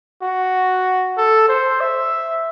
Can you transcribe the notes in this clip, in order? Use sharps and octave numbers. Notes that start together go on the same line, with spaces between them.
F#4
A4
C5
E5